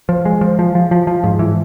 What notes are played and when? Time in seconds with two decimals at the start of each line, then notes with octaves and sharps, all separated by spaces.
0.09 F3
0.25 G#3
0.41 F3
0.59 F3
0.75 F3
0.91 F3
1.07 F3
1.24 G#2
1.39 E3